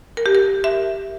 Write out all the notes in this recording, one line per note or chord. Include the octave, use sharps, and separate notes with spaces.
A#4
G4
A#4
E5